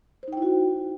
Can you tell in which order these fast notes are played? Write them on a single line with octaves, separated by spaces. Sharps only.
C5 D#4 G5 E4 F#4